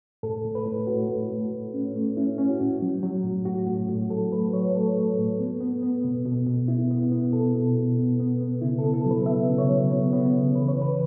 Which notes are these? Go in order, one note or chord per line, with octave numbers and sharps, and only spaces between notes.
A2 A4
A2
B4
A2
A2 F#4
A2
A3
A2
C#4
A3
C#4 E4
C#4
F#4
A2
F#3
F#3
A2
A2 F#4
A2
A2
F#3 A4
A3 B4
F#3 C#5
A3 A4
A3
A2
B3
B3
B3
B2
B2
B2
B3 E4
B3
B3
B2 A4
B2
B2
B3
B3
B3
C#3 E4
B3 A4
A4
F#3
B4
B3 E5
C#3
C#5
F#3
B3
B3
C#3
E3 B4
C#5
E3 B4